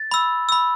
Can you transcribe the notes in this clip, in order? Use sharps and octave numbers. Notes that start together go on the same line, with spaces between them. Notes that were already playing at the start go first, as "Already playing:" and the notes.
Already playing: A6
B5 E6
B5 E6